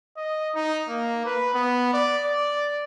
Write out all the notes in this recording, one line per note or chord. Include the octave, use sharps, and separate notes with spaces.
D#5
D#4
A#3
B4
B3
D5
D5